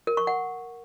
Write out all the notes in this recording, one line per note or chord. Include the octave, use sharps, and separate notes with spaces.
A#4
C#6
F#5